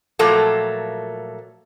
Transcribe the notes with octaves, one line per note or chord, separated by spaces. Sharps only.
A#2 F3 F#3 A3 A#3 A4